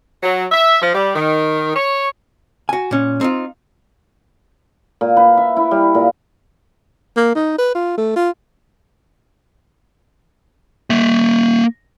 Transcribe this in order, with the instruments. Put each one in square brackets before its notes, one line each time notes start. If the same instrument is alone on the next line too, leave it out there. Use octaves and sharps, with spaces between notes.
[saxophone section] F#3
E5
F3
G3
D#3
C#5
[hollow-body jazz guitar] F#4 G#5
A#2 C#4
C4 D#4 F4
[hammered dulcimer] A#2
B4
E5
E4
G3
A#2
[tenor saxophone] A#3
D#4
B4
F4
A3
F4
[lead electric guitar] A#3 E5